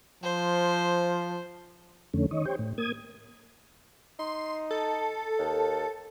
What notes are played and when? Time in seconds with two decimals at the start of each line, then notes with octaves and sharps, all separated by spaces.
0.23 F3 C5
2.14 F2 D3 A3 C#4
2.31 D#3 C#5 D#5
2.45 G4 C5 C#5 G5
2.59 A2
2.78 A#3 D#6 G#6
4.19 D#4 C6
4.71 A4
5.39 D#2